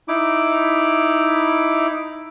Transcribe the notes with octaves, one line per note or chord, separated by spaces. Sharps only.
D#4 E4 D6